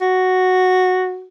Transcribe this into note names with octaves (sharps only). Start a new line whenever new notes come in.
F#4